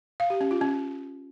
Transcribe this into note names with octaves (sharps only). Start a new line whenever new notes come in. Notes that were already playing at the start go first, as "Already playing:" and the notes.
F5
G4
C#4
F4
C#4